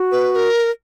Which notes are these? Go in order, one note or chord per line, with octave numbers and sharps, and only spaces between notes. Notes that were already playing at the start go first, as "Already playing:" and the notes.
Already playing: F#4
B4
B4
A#4